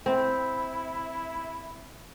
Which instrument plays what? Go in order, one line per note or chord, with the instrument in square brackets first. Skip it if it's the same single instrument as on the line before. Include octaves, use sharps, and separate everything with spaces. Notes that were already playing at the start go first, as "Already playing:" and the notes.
[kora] C4 [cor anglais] E4